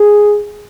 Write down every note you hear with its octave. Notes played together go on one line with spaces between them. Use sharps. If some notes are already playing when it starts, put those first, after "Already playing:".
Already playing: G#4